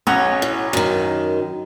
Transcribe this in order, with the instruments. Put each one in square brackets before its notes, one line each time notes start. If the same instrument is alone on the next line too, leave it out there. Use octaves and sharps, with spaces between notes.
[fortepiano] B1 C#4 F#5 [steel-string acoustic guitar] C#5
[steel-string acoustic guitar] A2
F#2 D#3